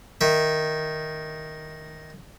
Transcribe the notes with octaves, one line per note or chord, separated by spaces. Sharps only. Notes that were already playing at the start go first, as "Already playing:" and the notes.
D#3 E5